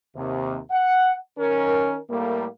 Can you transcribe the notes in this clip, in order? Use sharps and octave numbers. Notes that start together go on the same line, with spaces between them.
D#2 C3
F#5
D#3 C#4 A#4
A2 G3 A3 A#3